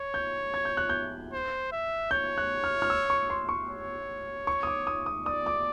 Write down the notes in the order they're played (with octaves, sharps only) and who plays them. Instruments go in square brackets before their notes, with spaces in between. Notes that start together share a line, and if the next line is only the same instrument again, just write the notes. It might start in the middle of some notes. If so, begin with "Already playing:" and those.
Already playing: [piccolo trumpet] C#5
[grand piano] G6
G#6
G6
F#6
G6
[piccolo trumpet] C5
E5
[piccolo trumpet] C#5 [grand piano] G6
[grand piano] F#6
F6
F6
E6
C#6
C6
C#6
[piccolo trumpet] C#5
[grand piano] C#6
D#6
D6
D#6
D#6
[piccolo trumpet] D5 [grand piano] D#6
[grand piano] D6